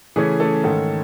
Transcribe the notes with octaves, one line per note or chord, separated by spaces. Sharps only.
C#3 E3 A3 C#4 G#4
A3 A4
G#2 D#3 A3 C#4